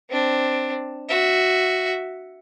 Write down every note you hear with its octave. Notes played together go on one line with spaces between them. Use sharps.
C4 D4
F#4 E5